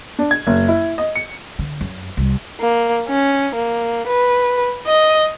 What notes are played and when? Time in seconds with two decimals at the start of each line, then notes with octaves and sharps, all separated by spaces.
0.19 D4
0.31 G#6
0.47 F#1
0.68 E4
0.98 D#5
1.15 C#7
1.59 D3
1.81 F#2
2.17 C2
2.60 A#3
3.09 C#4
3.56 A#3
4.08 B4
4.87 D#5